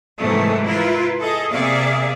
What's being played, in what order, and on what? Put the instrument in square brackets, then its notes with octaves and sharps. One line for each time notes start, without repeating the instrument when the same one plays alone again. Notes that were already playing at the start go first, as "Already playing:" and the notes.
[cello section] G#2 C3 D#3 E3 F#3 A3
E4 F4 A#4 B4
G#4 A4 D#5
C3 A#3 G#4 D5 E5 F5